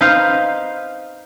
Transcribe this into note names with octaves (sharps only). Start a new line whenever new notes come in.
D#4 B4 C5 F5